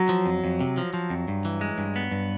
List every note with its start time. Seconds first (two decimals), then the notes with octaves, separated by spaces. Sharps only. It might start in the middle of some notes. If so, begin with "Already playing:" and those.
Already playing: F#3
0.09 F3
0.26 F2
0.44 F2
0.61 C3
0.78 F3
0.94 F3
1.10 F2
1.28 G2
1.45 E3
1.61 G#3
1.78 G2
1.96 B3
2.11 G2